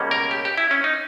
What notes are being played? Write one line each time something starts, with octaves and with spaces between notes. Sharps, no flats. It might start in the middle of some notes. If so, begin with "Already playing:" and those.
Already playing: C#2 B2 G3 A#3 C#4
A#4
G4
G4
E4
C#4
D#4